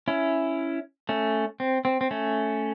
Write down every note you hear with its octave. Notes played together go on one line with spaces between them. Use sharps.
C#4 E4
A3 C#4
C4
C4
C4
A3 C#4